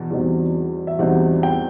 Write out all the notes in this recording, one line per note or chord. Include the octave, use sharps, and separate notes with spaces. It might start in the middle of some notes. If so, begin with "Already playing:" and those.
Already playing: E2 B2
E2 B2 G3 C4 D#4
E5
E2 B2 G3 C4 D#4 F#5
G5